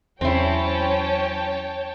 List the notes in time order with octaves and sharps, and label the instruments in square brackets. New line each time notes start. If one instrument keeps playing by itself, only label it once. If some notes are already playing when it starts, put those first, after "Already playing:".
[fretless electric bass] E2 [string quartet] F#3 C#4 [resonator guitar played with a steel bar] C4 E4 [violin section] C#5 G5 A5